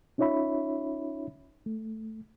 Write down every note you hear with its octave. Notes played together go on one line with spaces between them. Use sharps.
C#4 D#4 F4 C#5 E5 B5
A3